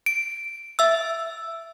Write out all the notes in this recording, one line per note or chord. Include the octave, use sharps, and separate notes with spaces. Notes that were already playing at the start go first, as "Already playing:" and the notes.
D7
E5 E6